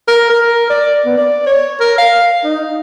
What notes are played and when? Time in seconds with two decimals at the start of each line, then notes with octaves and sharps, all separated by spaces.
0.08 A#4
0.30 A#4
0.70 D5
1.06 B3
1.18 D5
1.47 C#5
1.80 A#4
1.98 F5
2.44 D#4